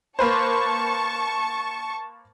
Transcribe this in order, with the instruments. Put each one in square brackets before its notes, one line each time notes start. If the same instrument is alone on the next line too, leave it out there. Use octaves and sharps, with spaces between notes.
[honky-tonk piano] A#3 B4 C5 [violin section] A5 C#6